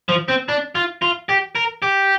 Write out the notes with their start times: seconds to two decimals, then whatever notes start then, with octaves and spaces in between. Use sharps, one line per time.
0.09 F3
0.28 C4
0.48 D4
0.75 F4
1.02 F4
1.29 G4
1.55 A#4
1.82 G4